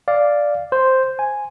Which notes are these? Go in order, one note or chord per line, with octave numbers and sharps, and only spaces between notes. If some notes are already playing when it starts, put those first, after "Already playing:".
D5 F5
C5
G#5